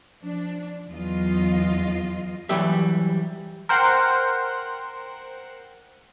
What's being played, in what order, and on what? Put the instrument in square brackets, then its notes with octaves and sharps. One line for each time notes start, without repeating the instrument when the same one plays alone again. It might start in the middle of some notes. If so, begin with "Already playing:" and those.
[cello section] F3 D4
E2 F#3 F4 D#5
[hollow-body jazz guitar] E3 F#3 G3 G4 E5
[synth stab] A#4 C5 F#5 G5